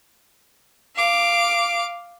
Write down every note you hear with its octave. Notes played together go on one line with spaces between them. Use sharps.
F5 D6